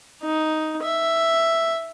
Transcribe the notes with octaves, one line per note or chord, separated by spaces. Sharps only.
D#4
E5